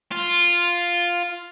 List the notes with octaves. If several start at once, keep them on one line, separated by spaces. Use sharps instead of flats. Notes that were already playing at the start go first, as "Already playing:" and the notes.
F4